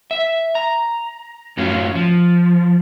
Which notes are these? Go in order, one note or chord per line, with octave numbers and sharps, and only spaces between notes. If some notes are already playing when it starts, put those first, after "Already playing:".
E5
A#5
F#2 A2 F#3 C#4 F4
F3